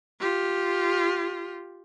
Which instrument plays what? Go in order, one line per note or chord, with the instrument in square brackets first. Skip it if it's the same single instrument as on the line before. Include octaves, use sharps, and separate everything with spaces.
[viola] F4 G4